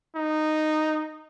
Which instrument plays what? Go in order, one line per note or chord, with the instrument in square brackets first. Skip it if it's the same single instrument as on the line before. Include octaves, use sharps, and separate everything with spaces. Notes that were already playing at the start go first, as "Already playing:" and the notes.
[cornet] D#4